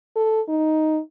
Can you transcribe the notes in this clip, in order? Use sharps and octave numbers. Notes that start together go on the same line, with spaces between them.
A4
D#4